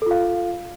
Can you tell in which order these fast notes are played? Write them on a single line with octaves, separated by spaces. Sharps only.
A4 F4 F5